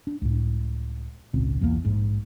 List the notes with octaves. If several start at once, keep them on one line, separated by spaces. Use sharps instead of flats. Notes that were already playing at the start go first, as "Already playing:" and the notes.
D4
C#2 A2
G#1 C#2 A#2 C4
B1 E2 E3 A#3
A#1 G#2